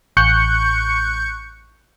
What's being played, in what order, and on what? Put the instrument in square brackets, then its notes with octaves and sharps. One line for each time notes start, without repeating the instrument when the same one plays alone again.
[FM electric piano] A1 C#6 F#6 G6 C#7